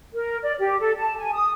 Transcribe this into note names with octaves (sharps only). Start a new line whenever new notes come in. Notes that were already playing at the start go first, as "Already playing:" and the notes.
A#4
D5
G4
A4
A5
G#5
D#6